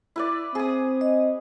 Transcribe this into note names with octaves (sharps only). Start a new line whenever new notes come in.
E4 B4 D5
C4 G#4 D#6
D#5